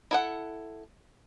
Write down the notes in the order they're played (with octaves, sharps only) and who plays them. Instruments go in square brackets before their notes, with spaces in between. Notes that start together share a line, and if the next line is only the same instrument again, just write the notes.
[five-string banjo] E4 A4 F#5